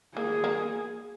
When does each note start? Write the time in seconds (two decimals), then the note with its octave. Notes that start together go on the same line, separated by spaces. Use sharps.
0.16 A#3 G#4
0.44 A#3